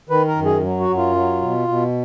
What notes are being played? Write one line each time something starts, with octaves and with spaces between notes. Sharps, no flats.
D#3 B4
A#4
F#2
G#4
F#3
F#4
F#2
F4
F#3
B2
B2